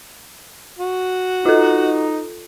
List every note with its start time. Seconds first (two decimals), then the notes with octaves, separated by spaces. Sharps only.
0.79 F#4
1.46 D#4 F4 A4